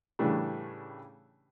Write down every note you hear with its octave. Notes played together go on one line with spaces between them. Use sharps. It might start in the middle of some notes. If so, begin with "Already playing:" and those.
A2 C#3 E3 G3 A3 D4